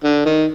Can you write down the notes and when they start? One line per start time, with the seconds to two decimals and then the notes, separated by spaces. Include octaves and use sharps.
0.04 D3
0.25 D#3